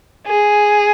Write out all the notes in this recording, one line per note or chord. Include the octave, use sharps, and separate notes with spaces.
G#4